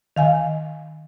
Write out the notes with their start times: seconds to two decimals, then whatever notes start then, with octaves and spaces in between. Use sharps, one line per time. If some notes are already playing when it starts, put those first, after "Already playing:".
0.16 D#3 F5 G#5